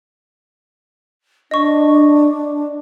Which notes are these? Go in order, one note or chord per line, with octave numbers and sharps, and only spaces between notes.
D4 D#5 C#6